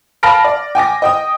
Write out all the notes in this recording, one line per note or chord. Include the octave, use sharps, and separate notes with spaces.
F5 A5 B5 F6 A#6 D7
D5
G5 G#5 D6 A#6
D#5 G5 D#6